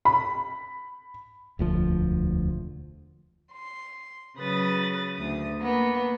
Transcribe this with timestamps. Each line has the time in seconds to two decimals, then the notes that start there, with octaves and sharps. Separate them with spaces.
0.05 B5
1.59 E1 D2 F3
3.53 C6
4.39 C#3 F#3 B4 D#6 A6
5.15 D2 D#6
5.59 A#3 B3